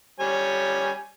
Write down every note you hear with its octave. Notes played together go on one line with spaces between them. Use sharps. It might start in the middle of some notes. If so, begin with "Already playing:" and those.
G3 C#5 G#5